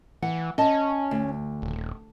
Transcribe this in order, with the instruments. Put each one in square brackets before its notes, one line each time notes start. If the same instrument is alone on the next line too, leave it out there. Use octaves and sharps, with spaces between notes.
[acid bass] E3 [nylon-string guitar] F#5
[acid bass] C#4 [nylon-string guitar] D#5 A5
[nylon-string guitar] D2
[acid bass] D#1